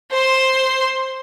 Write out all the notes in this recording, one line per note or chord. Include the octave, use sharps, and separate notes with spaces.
C5 C6